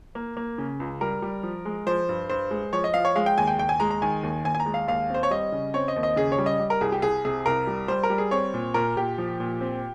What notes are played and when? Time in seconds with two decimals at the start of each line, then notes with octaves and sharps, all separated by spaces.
0.15 A#3
0.37 A#3
0.58 C#3
0.80 C#2
1.01 G3 A#4
1.22 G3
1.43 F3
1.65 G#3
1.86 F3 C5
2.09 G2
2.30 G2 C5
2.51 G#3
2.73 F3 C#5
2.84 D#5
2.94 F3 F5
3.05 C#5
3.16 G#3 F5
3.26 G5
3.38 D#2 G#5
3.47 G5
3.58 D#2 G5
3.69 G#5
3.80 G#3 A#5
3.91 A#5
4.02 D#3 G#5
4.23 D#2
4.44 D#2 G#5
4.55 G#5
4.60 A#5
4.66 G#3
4.74 F5
4.88 D#2 F5
5.10 C4 C5
5.23 C#5
5.31 G3 D#5
5.52 C#3
5.74 C4 C#5
5.88 D#5
5.96 D#2
6.03 D#5
6.16 C#3 G#4
6.32 C#5
6.38 G3
6.46 D#5
6.59 G3
6.70 A#4
6.81 C2 G#4
6.92 G4
7.02 C2 G#4
7.25 C3 G#4
7.46 C2 A#4
7.67 G3
7.88 G3 C5
8.03 A#4
8.10 G3
8.18 G#4
8.31 C4 C#5
8.54 A#2
8.74 A#2 A#4
8.96 A#2 G4
9.18 F3
9.40 A#2
9.61 C4